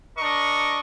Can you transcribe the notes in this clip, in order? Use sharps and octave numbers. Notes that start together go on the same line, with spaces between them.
D4 A#4 D#5 C#6